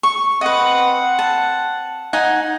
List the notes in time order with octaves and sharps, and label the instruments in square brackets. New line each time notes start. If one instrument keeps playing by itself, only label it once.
[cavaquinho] C#6
[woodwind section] C4 F#5 [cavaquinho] B4 D#5
[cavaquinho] A5
D#4 F#5 G#5